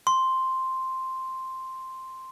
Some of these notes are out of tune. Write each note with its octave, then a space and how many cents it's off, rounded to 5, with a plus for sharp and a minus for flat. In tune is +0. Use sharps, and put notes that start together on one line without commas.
C6 +0